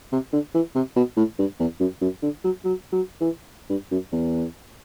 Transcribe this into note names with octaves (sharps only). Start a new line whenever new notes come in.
C3
D3
E3
C3
B2
A2
G2
E2
F#2
F#2
D3
F#3
F#3
F#3
E3
G2
F#2
E2